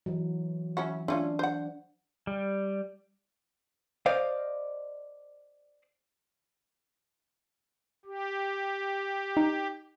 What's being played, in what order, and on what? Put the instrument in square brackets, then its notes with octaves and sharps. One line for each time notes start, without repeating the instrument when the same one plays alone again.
[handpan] E3 F#3
[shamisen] C#4 E4 F#4
[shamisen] A3 C#4 F4 [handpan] D4
[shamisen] C5 F#5
[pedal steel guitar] G3
[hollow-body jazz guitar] C5 D5 D#5 F5
[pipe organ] G4
[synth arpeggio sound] D#4